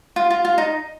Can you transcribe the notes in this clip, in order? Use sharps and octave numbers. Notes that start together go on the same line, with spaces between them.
F4
F4
F4
D#4